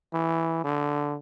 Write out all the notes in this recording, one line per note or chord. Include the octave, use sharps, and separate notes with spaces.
E3
D3